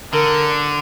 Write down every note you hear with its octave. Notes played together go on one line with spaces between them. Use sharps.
D3 A#4